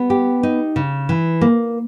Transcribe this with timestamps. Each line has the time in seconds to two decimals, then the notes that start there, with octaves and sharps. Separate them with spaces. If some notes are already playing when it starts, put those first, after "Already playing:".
Already playing: G3 B3
0.10 G4
0.43 D#4
0.76 C#3
1.09 E3
1.41 A#3